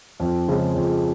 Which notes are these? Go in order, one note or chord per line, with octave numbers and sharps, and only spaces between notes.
F2
C#3 F3 G#3
F2